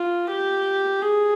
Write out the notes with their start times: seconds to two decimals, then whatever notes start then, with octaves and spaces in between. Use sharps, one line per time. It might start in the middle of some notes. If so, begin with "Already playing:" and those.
Already playing: F4
0.31 G4
1.03 G#4